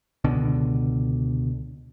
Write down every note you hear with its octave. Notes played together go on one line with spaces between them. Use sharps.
C#2 B2 D3